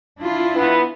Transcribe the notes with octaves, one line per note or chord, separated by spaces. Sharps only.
D4 E4 F4
E3 B3